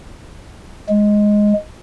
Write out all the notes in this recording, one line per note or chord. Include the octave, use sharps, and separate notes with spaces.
G#3